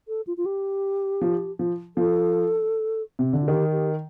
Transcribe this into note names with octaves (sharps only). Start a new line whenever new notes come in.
A4
F4
F4
G4
F3
F3
F3 A4
C3
D3
F4
D#3 G4
G4